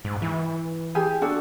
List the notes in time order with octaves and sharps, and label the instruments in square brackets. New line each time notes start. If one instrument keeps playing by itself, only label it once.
[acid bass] G#2
E3
[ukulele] G4 G#4 G#5
D4 F#4 A4